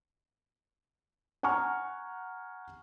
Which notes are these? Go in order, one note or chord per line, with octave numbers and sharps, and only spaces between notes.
F#5 G#5 A#5 C#6 F6